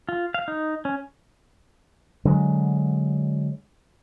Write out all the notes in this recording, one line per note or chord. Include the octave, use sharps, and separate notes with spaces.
F4
F5
D#4
C#4
D3 F#3 G#3